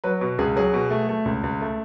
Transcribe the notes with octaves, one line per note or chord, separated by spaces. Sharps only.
F#3 B4
B2
C#2 G#4
F#3 G#4
B2
A3
A3
C#2
C#2
A3